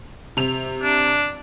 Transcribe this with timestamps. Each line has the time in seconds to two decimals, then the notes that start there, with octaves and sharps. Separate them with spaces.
0.37 C3 F7
0.83 D4